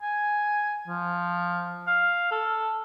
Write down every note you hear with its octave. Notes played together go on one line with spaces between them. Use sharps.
G#5
F3
F5
A4